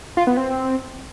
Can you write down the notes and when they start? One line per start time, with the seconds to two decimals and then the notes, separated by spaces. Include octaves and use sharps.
0.17 F4
0.27 B3
0.37 C4